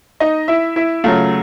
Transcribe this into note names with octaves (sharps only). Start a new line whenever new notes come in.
D#4 D#5
E4 E5
E4 E5
C#3 F#3 A3 F4 F5